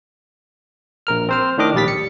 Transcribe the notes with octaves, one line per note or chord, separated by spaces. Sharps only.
A#1 A#4 F6
C4 C5 F6
A2 D#3 D4 D#5 D6 F6
A#1 D#2 G3 A6 B6
C#7